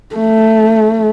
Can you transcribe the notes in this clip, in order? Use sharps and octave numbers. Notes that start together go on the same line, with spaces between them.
A3